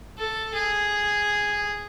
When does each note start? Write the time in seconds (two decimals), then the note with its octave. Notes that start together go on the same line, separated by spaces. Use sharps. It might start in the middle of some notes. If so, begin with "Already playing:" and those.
0.18 A4
0.54 G#4